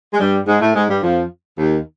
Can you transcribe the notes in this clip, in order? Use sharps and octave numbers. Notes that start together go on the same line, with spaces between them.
G#3
G2 G3
G#2 G#3
A2 A3
G#2 G#3
G2 G3
F2 F3
D#2 D#3